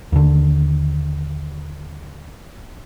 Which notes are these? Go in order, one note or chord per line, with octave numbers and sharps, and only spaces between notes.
D#2 D3